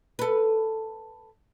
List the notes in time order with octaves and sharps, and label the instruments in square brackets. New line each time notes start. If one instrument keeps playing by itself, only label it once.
[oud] A4 B4